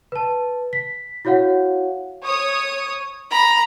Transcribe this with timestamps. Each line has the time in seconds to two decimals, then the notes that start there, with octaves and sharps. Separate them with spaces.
0.12 B4 A5
0.73 B6
1.25 E4 F#4 C#5 F5 F#5
2.23 C#5 D#6
3.31 A#5 B5